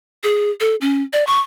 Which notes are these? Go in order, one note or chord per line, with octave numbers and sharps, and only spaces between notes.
G#4
A4
C#4
D5
C#6